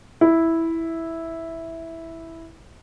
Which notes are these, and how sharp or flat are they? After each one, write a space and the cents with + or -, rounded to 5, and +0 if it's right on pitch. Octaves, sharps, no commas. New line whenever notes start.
E4 -5